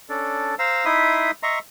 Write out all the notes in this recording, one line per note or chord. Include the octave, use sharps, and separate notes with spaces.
C#4 D4 A4 D5
C5 F5 A#5 E6
D#4 E4 E5 B5 C6 D#6
D#5 E5 A#5 C6 C#6